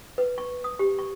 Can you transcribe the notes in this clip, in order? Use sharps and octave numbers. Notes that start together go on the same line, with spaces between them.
B4
C#6
D#6
G4
C#6